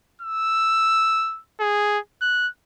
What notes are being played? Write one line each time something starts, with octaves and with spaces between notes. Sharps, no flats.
E6
G#4
F#6